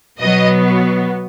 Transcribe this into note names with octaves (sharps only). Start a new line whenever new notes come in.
B2 F#3 B3 D#5